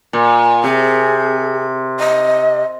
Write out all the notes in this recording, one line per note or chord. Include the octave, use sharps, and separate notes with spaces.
A#2
C3 G#4
D#5